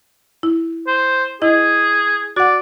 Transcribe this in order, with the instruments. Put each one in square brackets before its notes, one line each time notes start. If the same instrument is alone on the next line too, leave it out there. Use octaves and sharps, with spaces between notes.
[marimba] E4
[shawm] C5
[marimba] E4 D#5 [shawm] G#4
[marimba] F#4 F#5 [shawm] D5